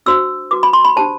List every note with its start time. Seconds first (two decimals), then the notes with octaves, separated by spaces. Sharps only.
0.06 D4 F#4 C5 E6
0.51 F#4 B4 D6
0.63 B5
0.73 C6
0.85 B5
0.96 D4 G4 C5 A5